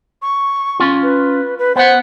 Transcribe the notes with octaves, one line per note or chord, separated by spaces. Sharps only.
C#6
C#4 F4
B4
B4
B3 C5 F#5